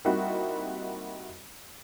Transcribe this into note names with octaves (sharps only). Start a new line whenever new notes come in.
G3 A#3 C4 D#4 E4 F#4